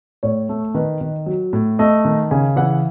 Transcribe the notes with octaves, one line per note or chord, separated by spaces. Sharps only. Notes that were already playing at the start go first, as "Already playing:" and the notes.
A2 C#5
A3
D#3 B4
D#3
F#3
A2
A3 D#5
D#3
C#3 G#5
E3 F#5